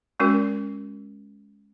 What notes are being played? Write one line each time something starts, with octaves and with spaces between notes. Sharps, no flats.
G#3 C#4 F#4 A#4